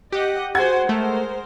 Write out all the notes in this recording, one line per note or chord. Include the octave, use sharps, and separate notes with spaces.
G4 D#5 F#5
F#4 G#4 C5 F#5 G#6
G#3 A3 A#4 C5